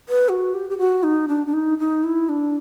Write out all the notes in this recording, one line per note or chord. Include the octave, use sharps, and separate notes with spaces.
B4
F#4
G4
G4
F#4
D#4
D4
D4
D#4
D#4
E4
D4